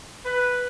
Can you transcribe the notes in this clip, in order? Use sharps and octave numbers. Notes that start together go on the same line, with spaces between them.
B4